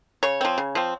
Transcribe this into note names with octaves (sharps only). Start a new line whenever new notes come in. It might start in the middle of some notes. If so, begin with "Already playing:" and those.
C#3 C#5
F3 C4
C#3
F3 C4